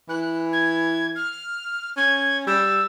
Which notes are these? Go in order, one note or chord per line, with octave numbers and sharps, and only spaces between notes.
E3 F#6
G#6
F6
C#4 G#6
G3 E6